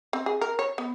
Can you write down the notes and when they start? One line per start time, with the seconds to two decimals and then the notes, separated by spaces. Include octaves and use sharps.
0.13 C4
0.26 G#4
0.41 A#4
0.59 C#5
0.78 B3